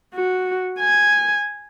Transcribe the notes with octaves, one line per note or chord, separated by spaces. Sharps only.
F#4
G#5